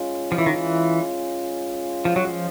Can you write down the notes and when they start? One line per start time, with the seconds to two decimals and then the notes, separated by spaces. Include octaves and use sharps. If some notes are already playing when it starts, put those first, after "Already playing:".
Already playing: G#3 C#4 F4
0.32 F3
0.38 E3
0.46 D#3
0.54 E3
2.05 F3
2.16 F#3
2.27 F3